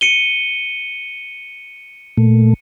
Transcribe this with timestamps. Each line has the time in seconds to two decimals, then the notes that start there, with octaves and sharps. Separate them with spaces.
0.01 C#7 D#7 G7
2.17 A#2 A3